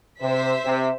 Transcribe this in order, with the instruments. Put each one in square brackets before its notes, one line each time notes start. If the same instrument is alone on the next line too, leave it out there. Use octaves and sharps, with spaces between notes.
[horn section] C3 [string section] C5 E5 B6
[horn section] C3